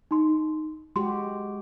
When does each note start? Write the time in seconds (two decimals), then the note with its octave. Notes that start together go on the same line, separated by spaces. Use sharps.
0.11 D#4 C6
0.96 G#3 F#4 G4 C6